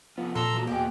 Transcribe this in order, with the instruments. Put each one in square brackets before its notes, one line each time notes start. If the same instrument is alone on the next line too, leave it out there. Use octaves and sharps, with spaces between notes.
[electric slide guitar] C3 F3 F4 [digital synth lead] B3
[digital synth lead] A#2 [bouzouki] A4 [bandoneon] A#5 C6 E6
[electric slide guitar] E3 F#4
[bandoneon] E2 B2 [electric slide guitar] A#3 G#5 [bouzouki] G4